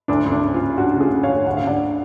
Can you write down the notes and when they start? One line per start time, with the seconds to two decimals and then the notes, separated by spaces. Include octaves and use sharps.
0.08 D2 D4
0.26 D2
0.32 D4
0.43 C#3
0.54 F4
0.61 C#3
0.77 C#3 D4 F#4
0.95 C#3
1.00 F4 G#4
1.13 C#3
1.23 C#5 F5
1.29 D2
1.46 D2 F#5
1.57 F5
1.64 D3 D5 F#5